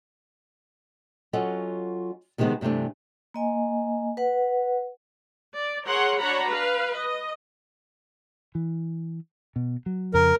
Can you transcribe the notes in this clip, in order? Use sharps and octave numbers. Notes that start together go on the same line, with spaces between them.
F#3 C#4 F4 A4 D#5 F#5
C3 D#3 F3 G#3 B3
G2 C3 E3 A3 D4
A#3 D#5 G#5
B4 F#5
D5
G#4 A#4 C#5 F#5 C6
D4 F#4 C#5 F#5 A#5 B5
B4 F5
D#5
E3
B2
F#3
F2 C#3 A#4